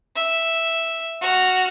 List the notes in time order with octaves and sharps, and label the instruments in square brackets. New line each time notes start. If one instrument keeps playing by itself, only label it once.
[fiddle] E5
F#4 F6